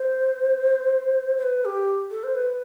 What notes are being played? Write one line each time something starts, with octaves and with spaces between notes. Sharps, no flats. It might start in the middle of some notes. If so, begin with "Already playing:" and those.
Already playing: C5
C5
B4
G4
A4
C5
B4